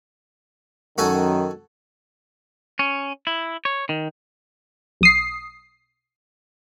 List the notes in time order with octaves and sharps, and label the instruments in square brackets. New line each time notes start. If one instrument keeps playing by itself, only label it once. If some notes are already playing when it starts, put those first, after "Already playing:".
[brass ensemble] F#2 D#3 [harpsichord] F#4 A4 G#5
[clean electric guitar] C#4
E4
C#5
D#3
[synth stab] B1 D#6 C7